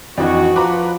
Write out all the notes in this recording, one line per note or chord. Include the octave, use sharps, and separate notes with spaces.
F2 E3 D4 D#4 F#4
F3 B4 A#5 D6